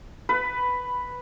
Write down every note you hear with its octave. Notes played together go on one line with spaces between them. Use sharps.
B4